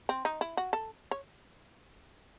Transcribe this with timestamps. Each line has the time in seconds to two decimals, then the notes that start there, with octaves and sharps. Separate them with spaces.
0.09 C4
0.25 D#4
0.41 E4
0.57 F#4
0.73 A4
1.11 C#5